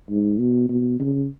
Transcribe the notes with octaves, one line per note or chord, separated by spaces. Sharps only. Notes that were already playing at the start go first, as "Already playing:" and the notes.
G#2
B2
B2
C#3